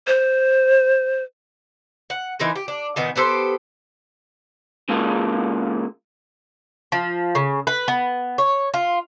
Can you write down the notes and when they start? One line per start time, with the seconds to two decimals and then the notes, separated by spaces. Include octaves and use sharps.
0.07 C5
2.10 F#5
2.39 E3 D#4 A#4 C5
2.55 G4
2.68 D4
2.96 A#2 D#3 B3
3.16 B3 G4 A4 C5
4.89 C#3 G#3 A#3 F4 A4
6.92 F3
7.35 C#3
7.67 B4
7.88 B3
8.38 C#5
8.74 F4